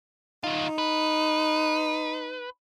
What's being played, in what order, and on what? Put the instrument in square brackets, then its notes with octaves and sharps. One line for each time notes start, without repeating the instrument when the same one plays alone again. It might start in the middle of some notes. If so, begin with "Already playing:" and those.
[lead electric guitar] D#3 F4 [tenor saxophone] D#4
[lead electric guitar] B4